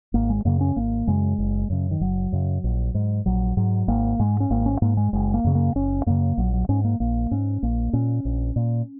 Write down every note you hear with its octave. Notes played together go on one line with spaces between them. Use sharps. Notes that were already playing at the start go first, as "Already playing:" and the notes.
G#1 A#3
G#3
F#2 C#3 A#3
C#4
G#1 A#3
F#2 C#3 G#3
F#1
F#2 C#3
D#3
F#1 F#3
F#2 C#3
A#1
G#2
A#1 F#3
G#2 F#3
G#1 A#3
G#2 G#3
C#4
G#1 A#3
C#4
G#2 A#3
G#3
F#1 G#3
A#3
F#2 C#3
A#3
F#1 C#4
F#2 C#3 A#3
A#1 F#3
F#3
G#2 C#4
A#3
A#1 A#3
G#2 C#4
A#1 A#3
A#2 C#4
A#1
A#2